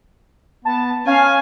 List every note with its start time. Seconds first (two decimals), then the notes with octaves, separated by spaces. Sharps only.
0.65 B3 A5
1.07 C#4 F5 G#5